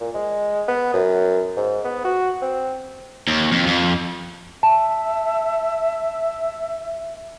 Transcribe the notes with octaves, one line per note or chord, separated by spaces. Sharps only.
A#2
G#3
B3
F#2
G#2
B3
F#4
C4
D#2
F2
F2
E5 A5